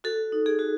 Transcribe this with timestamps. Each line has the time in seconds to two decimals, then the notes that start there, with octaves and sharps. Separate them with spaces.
0.04 F#4 A4
0.32 D#4
0.46 G#4
0.59 F#4